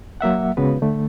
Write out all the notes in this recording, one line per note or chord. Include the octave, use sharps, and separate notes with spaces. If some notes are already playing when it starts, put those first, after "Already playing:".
F#3 A#3 E5 F#5
C#3 G#3 B3 F#4 B4
D3 A3